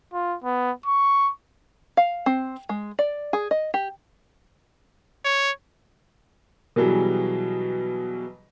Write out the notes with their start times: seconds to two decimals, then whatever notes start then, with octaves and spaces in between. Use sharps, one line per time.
0.13 F4
0.44 B3
0.86 C#6
1.97 F5
2.26 C4
2.69 G#3
2.99 D5
3.33 G#4
3.51 D#5
3.74 G4
5.25 C#5
6.76 B2 E3 F#3 G3 G#4